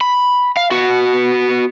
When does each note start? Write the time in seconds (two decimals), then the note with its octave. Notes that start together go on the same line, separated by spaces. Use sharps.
0.01 B5
0.57 F5
0.71 B3 F#4